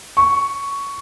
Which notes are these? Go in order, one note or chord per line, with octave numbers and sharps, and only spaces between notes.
C#6